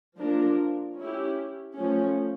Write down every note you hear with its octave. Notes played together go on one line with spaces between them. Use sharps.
F3 A#3 D4 F4 A#4
C#4 E4 G4
F3 A3 C#4